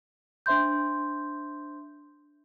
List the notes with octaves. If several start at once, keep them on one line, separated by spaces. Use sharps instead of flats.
D4 C5 E5 C6 G6